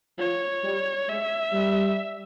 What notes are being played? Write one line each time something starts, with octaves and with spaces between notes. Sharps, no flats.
F3 C#5
G3
G#3 E5
G3